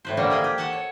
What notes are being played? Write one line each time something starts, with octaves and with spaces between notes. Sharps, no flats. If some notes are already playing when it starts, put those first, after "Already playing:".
A2 B4 C5
D3 G3 A3 A#3 D4
F3 G#4 D#5
G4
F#4 A4 F#5 G#5 A5
C#5